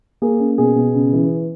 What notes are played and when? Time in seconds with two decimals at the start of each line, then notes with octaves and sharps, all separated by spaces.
0.22 A#3 G#4
0.40 C#4
0.58 B2 G#4
0.76 B2
0.94 C#3
1.13 E3